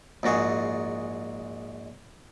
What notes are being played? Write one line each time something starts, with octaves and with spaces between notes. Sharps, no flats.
A#1 G#2 F#4 G#4